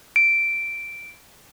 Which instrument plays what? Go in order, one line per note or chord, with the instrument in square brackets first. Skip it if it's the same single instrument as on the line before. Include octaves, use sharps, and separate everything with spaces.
[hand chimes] D7